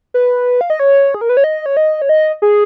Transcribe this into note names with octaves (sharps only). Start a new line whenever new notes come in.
B4
F5
D#5
C#5
G#4
A#4
B4
C#5
D#5
C#5
D#5
C#5
D#5
G#4